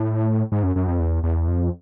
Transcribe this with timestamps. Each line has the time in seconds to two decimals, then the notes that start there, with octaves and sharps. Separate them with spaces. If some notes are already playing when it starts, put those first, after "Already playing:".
Already playing: A2
0.52 G#2
0.63 F#2
0.76 F#2
0.88 F2
0.99 E2
1.23 E2
1.48 F2